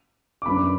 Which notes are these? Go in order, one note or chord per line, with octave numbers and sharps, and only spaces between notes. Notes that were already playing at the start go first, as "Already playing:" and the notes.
D6
F#2 F#3 B3 D4 B5